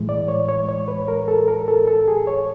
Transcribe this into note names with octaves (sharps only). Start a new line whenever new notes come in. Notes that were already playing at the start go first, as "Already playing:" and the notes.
Already playing: A2 E3 G#3
D5
C#5
C#5
C#5
B4
A#4
A4
A#4
A4
A4
G#4
C#5